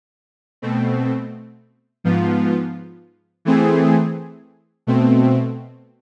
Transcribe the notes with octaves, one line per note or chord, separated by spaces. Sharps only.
B2 A3 C4
G#2 F3 B3 F4
E3 A3 C4 G#4
B2 A3 C4